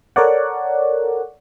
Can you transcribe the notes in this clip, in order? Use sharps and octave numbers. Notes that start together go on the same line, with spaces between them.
A4 A#4 C#5 D5 F#5